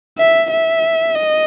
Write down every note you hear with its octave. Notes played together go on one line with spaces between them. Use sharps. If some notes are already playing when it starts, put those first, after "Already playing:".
E5
E5
D#5